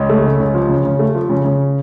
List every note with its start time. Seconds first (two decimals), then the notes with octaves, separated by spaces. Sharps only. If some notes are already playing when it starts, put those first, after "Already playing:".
Already playing: C#2
0.09 A3
0.24 C#3
0.40 C#2
0.54 F3
0.69 C#3
0.85 C#3
0.99 A3
1.15 F3
1.30 C#3
1.45 C#3